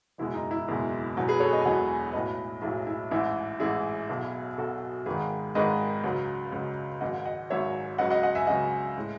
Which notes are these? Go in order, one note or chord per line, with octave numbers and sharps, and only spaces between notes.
F#1 E2 B2 G#3 E4
D#4
E4
F#1 E2 B2 G#3
E1 E2 B2 F#3
G#4 B4
A4 C#5
B4 D#5
G#5
E1 E2 B2 F#3 D#5 F#5
B1 A2 F#3 B4 D#5
B1 A2 F#3 E4 G#4
E4
A1 G#2 E3 E4
A1 G#2 E3 E4 G#4
B1 B2 F#3
B1 B2 F#3 F#4 A4
G#1 G#2 D#3 G#3 G#4 B4
G#1 G#2 D#3 G#3 B4 D#5
C#2 C#3 F#3
C#2 C#3 F#3
G#1 G#2 F#3 D#5 F#5
D#5 F#5
G#1 G#2 F#3 C#5 E5
C#2 C#3 F#3 D#5 F#5
D#5 F#5
D#5 F#5
E5 G#5
C#2 C#3 F#3 D#5 F#5
A2 G#3